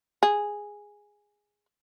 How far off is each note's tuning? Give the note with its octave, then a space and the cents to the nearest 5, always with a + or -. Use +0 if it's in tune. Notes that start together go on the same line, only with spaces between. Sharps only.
G#4 -5